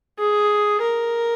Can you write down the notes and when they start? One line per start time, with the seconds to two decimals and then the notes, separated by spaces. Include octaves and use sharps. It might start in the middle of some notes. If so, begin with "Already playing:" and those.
0.19 G#4
0.82 A#4